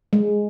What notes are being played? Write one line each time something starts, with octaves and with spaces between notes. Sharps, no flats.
G#3